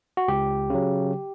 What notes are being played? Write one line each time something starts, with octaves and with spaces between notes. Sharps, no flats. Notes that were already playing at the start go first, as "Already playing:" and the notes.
F#4
C#2 G4
C#3 F#3